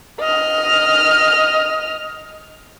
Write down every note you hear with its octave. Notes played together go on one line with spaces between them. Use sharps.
D#5 F6